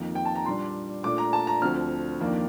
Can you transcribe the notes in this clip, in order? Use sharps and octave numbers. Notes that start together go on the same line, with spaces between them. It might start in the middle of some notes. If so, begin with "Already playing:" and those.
Already playing: F2 D#3 A#3 D#4
G5
A5
A#5
A#2 G3 D4 C6
A#2 A3 D4 D6
A#5
A5
A#5
D2 D3 F3 C4 F6
F2 D#3 A#3 D4